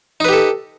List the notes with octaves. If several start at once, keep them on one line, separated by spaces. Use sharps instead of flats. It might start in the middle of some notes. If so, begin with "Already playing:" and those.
D#4 G4 A4 B4